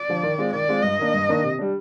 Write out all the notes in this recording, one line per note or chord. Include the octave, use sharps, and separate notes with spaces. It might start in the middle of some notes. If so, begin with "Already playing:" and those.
Already playing: D5
D3 F3
D#3
G#3 C4 F4
D#3 D5
G#3 C4 F4
G2 D#5
D#3 A#3 D4
G2
D#3 A#3 D4
C3
G3 D4